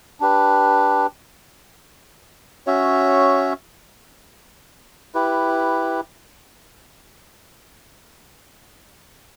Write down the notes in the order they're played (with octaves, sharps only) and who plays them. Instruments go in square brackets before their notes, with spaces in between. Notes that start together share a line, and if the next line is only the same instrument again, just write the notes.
[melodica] D4 G4 B4
C#4 F#4 C#5 E5
E4 G4 B4